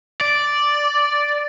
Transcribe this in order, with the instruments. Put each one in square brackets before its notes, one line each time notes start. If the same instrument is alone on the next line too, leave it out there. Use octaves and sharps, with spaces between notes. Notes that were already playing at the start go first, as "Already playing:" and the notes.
[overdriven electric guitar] D5